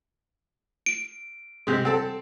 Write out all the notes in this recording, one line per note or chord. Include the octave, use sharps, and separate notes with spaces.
D7
C3 G#3
C4 A4